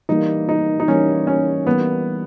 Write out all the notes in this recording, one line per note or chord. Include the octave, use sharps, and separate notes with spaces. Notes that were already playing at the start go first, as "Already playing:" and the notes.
E3 G3 A#3 D#4
D#4
D#4
E3 G3 A#3 C#4
C#4
E3 G3 A#3 B3